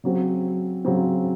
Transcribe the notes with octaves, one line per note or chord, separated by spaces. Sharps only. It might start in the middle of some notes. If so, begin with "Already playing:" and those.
C#3 F#3 C4
C#3 F#3 C4